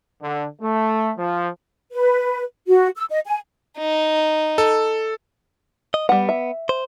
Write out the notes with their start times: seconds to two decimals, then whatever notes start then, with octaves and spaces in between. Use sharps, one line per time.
0.22 D3
0.61 A3
1.17 F3
1.93 B4
2.68 F#4
2.97 E6
3.10 D#5
3.25 G#5
3.78 D#4
4.58 A4
5.94 D#5
6.09 G3 B3 F#5
6.29 E5
6.69 C5